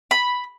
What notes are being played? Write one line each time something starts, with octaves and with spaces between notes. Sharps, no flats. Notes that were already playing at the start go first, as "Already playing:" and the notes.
B5